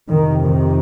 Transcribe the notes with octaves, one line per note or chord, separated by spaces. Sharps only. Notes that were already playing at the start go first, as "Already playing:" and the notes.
F2 C3 D#3
D#3